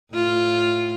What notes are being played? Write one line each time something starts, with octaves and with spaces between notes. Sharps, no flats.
A2 F4